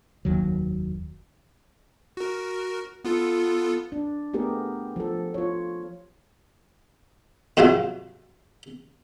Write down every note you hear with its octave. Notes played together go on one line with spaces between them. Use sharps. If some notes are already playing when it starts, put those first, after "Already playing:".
F1 D#2 D#3 F#3
F#4 A#4
B3 F4 A4
D4
A3 B3 G4 G#4 A#4
F3 A4
F4 C#5
F2 G#2 C3 F3 F#3